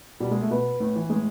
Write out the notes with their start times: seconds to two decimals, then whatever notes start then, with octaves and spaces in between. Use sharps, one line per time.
0.20 B2 G3
0.31 G#3
0.41 A3
0.50 B2 B3
0.80 A2
0.96 E3
1.10 A2 G#3